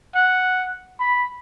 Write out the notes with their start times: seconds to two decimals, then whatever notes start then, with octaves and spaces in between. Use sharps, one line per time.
0.15 F#5
1.00 B5